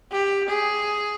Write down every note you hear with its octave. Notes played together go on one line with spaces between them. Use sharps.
G4
G#4